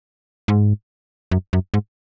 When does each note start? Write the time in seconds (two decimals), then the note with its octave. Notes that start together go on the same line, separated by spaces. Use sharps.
0.48 G#2
1.31 F#2
1.53 F#2
1.74 G#2